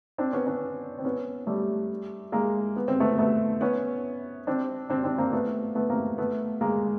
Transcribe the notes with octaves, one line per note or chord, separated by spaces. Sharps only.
C4 D4
B3 C#4
B3 C#4
C4
B3 C#4
G3 A3
G#3 A#3
B3
C4
A3 B3
A3 B3
B3 C#4
C4 D4
C4 D4
C4 D4
A#3 C4
A3 B3
A3 B3
A#3 C4
A3 B3
G#3 A#3